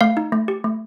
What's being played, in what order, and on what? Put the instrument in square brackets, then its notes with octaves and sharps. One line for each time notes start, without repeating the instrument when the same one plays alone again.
[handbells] A3 F5
D#4
A3
G4
A3